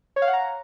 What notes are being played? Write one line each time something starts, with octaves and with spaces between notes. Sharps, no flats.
C#5
F5
F#5
A#5